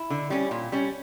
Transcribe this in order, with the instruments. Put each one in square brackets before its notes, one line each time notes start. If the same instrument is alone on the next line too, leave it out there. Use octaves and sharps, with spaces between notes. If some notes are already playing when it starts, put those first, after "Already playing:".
Already playing: [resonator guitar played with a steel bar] E4
D3
G3 C#4
A#2
G3 C#4